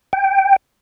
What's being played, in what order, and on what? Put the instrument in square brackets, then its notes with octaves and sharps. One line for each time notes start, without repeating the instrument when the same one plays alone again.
[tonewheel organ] G5